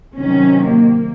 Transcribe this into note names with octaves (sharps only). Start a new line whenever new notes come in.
C3 D#3 F#3 C#4
A#3